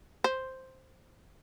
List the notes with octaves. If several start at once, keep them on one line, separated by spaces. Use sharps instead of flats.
C5